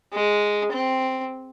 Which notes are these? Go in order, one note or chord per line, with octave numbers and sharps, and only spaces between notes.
G#3
C4